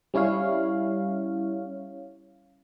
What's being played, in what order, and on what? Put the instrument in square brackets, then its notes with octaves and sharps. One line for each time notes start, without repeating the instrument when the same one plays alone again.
[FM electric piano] G3 C#4 E4 C#5 F5